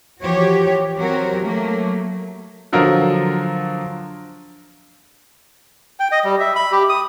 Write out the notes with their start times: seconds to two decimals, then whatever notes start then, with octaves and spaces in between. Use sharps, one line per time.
0.22 E3 F3 F#4 G4 C#5
0.97 F#3 C4 F#4 G4 A#4 C#5
1.42 F#3 A3 A#3
2.73 D3 F3 F#3 F4 A#4
6.00 G5
6.12 D#5
6.24 G3
6.40 E5
6.56 B5
6.72 G4
6.89 D#6